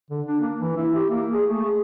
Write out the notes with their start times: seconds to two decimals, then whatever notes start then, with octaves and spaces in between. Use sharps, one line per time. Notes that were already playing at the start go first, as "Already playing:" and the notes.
0.11 D3
0.26 D4
0.41 A#3
0.60 E3
0.77 E4
0.95 G4
1.10 A#3
1.32 G#4
1.47 A3
1.64 G#4